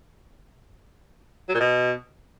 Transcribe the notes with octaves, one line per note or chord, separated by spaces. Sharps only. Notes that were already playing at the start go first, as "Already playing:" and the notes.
F#3
A#2
B2